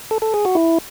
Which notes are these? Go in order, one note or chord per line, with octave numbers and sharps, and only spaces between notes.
A4
A4
G#4
F#4
E4